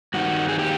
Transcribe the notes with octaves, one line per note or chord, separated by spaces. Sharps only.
G2 D#3 F#4
G#4
G4